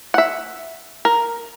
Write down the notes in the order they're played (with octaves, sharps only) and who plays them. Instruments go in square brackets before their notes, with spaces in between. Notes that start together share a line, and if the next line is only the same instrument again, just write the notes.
[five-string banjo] E5 F#5
A#4